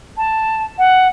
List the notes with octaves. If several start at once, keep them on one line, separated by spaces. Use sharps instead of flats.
A5
F#5